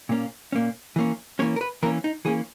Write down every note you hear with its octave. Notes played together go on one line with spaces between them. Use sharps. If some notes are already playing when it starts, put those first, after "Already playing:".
A#2 A#3 C#4
A#2 A#3 C#4
E3 A#3 C#4
E3 A#3 C#4 C#5
A#4
B4
E3 A#3 C#4 A#4
D#4
E3 A#3 C#4 G#4